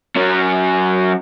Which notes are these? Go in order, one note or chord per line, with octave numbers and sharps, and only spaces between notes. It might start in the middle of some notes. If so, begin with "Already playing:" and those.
F#3 C#4